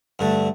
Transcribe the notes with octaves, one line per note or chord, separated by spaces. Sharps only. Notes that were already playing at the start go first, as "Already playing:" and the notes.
G2 D3 A3